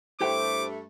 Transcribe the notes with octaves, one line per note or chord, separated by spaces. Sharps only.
G2 A3 E4 G4 C5 G5 D6